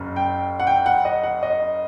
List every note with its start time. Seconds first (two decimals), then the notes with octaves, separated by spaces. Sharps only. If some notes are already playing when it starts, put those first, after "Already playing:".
Already playing: F#1 F#2
0.16 G5
0.60 F#5
0.67 G5
0.86 F#5
1.05 D#5
1.23 F#5
1.43 D#5